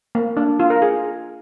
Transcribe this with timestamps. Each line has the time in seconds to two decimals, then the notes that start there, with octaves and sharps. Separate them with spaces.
0.15 A#3
0.37 D4
0.60 F4
0.70 A#4
0.82 G#4